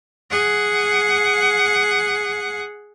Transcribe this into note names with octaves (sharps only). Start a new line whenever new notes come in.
G#4 F#5